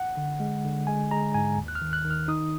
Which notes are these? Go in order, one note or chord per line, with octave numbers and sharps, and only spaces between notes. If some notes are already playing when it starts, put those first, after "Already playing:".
Already playing: F#5
D3
G#3
D3
G#3 G#5
G#3 A#5
G#2 G#5
D#2
F#6
F6
D#3
F#6
D#3
F6
D#4 D#6